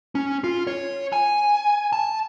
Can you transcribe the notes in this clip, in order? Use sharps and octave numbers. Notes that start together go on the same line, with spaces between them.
C#4
F4
C#5
G#5
A5